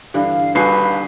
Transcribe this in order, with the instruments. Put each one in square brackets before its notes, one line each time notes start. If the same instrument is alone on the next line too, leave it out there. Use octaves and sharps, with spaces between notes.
[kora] G2 D3 E3 [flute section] F5
[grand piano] D#1 G#5 C7 [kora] F#4 A4 [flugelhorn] B4 [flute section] F5